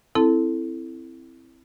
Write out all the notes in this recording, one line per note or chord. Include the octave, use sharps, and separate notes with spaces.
C4 E4 A4 A5